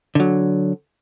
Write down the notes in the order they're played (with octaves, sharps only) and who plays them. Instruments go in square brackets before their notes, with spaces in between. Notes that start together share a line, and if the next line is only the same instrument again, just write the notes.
[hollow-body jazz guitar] D3 F#3